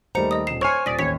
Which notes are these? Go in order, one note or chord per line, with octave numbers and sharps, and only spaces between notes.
D#2 D#3 G3 A3 C5 A#5 C#7
D#5 D#6
D#1 C7 E7
C5 C#5 G#5 C6 C#6 F6 C7
D#1 D5 D#6 A#6 B6
A1 D#2 C#5 B6